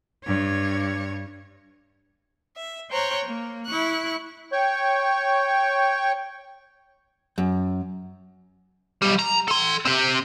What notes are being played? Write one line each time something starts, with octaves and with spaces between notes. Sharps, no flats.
G2 C#5
E5
C5 C#5 G5 A#5 F#6
A#3
E4 C#6 F#6
C#5 G5 C#6
F#2
B1 G3
A#5
A4 C6
C4 G4